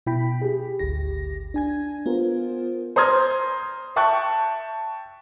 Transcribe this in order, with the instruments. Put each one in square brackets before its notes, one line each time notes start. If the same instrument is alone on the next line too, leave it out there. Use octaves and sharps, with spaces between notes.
[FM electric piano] B2 E4 G5 B5 B6
G4 G#4
G#1 D2 G4 A#6
D4 G#5 G#6
B3 F4 A#4 C5
[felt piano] C5 A#5 C6 D#6 F6 G#6
E5 G5 A5 C#6 F#6